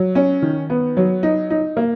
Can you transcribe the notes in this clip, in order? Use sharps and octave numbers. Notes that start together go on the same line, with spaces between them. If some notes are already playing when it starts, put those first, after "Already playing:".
Already playing: F#3
C#4
D#3
B3
F#3
D#4
D#4
A#3